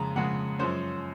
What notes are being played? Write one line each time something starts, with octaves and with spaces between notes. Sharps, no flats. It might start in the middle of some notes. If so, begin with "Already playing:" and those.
Already playing: F2 C#3 G#3 A#5
F2 C#3 G#3 F#5
F#2 F3 G#3 C#4 C5